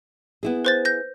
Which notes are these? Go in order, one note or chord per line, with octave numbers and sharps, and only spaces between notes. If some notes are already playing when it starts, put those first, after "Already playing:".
B3 E4 G#4
B4 C5 A6
G6 A#6